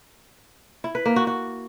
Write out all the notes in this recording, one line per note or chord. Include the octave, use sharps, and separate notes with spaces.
E4
B4
A#3
F#4
F#4